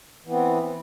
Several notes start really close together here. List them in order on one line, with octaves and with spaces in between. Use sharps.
E3 B3 C4